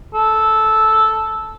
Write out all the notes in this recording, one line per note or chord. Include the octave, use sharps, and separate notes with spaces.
A4